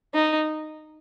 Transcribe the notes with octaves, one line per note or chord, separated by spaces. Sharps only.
D#4